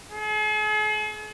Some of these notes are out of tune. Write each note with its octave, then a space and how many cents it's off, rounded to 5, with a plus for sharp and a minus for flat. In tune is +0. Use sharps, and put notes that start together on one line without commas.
G#4 +45